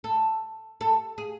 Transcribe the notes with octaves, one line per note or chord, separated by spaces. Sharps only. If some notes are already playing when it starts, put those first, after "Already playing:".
A4
A4
G#4